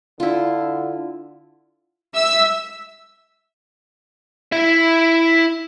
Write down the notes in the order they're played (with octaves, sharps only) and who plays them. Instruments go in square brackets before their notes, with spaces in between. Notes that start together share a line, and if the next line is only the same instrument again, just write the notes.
[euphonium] D3 [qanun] E4 F4
[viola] E5 [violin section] E6
[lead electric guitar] E4 E5